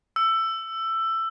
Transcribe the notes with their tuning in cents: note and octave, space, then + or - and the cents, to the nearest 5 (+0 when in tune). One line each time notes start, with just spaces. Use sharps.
E6 +15